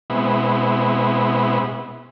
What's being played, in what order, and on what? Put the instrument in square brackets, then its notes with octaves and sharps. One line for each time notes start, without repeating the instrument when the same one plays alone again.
[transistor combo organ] B2 G#3 B3 C4 E4